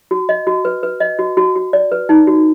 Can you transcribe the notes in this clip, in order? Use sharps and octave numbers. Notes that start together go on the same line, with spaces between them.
F#4
D#5
F#4
B4
B4
D#5
F#4
F#4
F#4
D5
B4
D#4
F#4